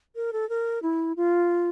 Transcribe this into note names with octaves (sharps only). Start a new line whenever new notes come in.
A#4
A4
A#4
E4
F4